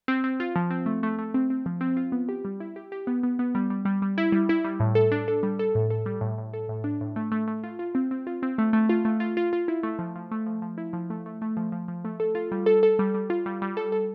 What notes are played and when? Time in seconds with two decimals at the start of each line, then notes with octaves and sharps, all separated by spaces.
0.08 C4
0.24 C4
0.40 F4
0.56 F3
0.70 C4
0.86 A3
1.03 A3
1.19 A3
1.34 C4
1.50 C4
1.66 F3
1.81 C4
1.97 F4
2.12 B3
2.29 G4
2.45 G3
2.60 E4
2.76 G4
2.92 G4
3.07 B3
3.23 B3
3.39 B3
3.55 G3
3.70 G3
3.85 G3
4.02 G3
4.18 E4
4.32 G3
4.49 E4
4.65 G3
4.80 A2
4.95 A4
5.12 D4
5.28 A4
5.43 G3
5.59 A4
5.75 A2
5.90 A4
6.06 G3
6.21 A2
6.38 A2
6.54 A4
6.69 A2
6.84 D4
7.01 A2
7.16 A3
7.32 A3
7.48 A3
7.64 F4
7.79 F4
7.95 C4
8.11 C4
8.27 F4
8.43 C4
8.58 A3
8.73 A3
8.89 F4
9.05 A3
9.20 F4
9.37 F4
9.53 F4
9.68 E4
9.83 A3
9.99 F3
10.16 F3
10.31 A3
10.46 F3
10.62 F3
10.78 E4
10.93 F3
11.10 A3
11.26 A3
11.42 A3
11.57 F3
11.72 F3
11.88 F3
12.05 A3
12.20 A4
12.35 F4
12.52 G3
12.66 A4
12.83 A4
12.99 G3
13.14 G3
13.30 F4
13.46 G3
13.62 G3
13.77 A4
13.92 A4